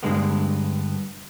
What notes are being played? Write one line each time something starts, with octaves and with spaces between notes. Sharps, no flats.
G2 B2 D3 G#3 A#3 B3